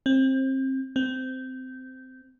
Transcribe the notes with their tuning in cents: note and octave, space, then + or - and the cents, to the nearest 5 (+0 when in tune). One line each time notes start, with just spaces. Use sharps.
C4 +25
C4 -15